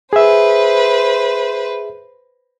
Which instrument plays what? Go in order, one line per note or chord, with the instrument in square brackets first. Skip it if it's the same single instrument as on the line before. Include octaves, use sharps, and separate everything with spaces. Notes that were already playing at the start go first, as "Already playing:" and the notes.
[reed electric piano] G#4 E5 [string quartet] B4 C5